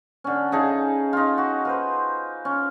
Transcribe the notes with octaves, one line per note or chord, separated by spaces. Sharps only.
D3 C#4
C#3 D#4 G#4 A5
D#4 F4
F#4
F4 B4 C5
C#4